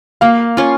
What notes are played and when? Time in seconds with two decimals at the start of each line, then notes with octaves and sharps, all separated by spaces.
0.21 A#3 F5
0.57 C#4 F4